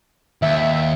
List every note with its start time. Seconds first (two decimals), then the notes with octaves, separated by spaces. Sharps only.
0.42 D#2 E5